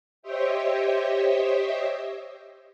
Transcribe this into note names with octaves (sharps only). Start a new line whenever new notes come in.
G4 C5 C#5 D#5 E5 G5